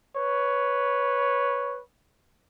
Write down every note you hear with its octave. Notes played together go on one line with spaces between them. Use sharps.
B4 C#5